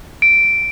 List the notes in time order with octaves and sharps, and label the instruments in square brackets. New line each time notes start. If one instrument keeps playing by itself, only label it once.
[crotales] D7